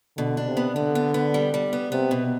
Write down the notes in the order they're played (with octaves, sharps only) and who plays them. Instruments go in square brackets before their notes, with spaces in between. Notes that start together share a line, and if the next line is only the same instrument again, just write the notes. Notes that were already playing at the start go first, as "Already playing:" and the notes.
[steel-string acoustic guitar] B2 [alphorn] D3
[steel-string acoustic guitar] D4
[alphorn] C3
[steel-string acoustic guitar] B3
[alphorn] D3 [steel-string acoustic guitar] B3
[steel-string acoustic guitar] B3
B3
G3
G3
B3
[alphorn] C3 [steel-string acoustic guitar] B3
[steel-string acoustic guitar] B2